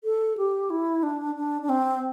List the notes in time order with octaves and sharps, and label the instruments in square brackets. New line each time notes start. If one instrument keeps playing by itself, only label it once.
[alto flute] A4
G4
E4
D4
D4
D4
C4